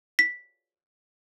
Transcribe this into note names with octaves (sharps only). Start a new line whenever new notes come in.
B6